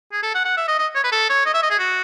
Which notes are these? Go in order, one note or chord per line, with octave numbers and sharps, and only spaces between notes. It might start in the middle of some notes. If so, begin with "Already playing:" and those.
G#4
A4
F#5
F#5
E5
D#5
D#5
C#5
B4
A4
C#5
D#5
E5
D#5
G#4
F#4